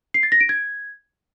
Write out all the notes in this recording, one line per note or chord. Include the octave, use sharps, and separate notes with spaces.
C7
A6
A#6
D7
G#6